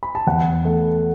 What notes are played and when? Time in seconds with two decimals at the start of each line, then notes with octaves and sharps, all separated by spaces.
0.03 B5
0.15 A5
0.27 E2 F#5
0.65 A3